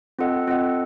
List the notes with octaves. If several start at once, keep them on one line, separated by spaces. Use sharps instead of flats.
C4 F4 A4 D#5 F#5
C4 F4 A4 D#5 F#5